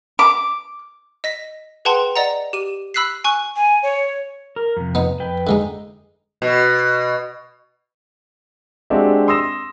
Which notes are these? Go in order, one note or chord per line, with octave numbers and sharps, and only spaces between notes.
D6
D#5 A#6 B6
G#4 B4 F#5 G5 A5 C6
D5 D#5 F#5 A#5
G4 D#7
B5 E6 F#6 B6 C7
G#5 C#6 F#6
G#5
C#5
A#4
F2 C3
B3 D#4
F2 B4 G5
D3 G#3 D#4
B2
G#3 C4 D4 F#4 G4 E5
C6 D#6 E6 A#6 E7